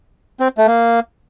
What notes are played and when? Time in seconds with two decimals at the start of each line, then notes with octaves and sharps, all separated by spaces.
0.40 C4
0.58 A3
0.67 A#3